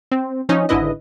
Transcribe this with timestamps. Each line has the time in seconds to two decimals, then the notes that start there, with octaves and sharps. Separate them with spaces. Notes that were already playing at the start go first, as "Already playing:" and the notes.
0.12 C4
0.49 F3 C#4 D#4
0.69 G#1 G#2 D3 E4 B4 D#5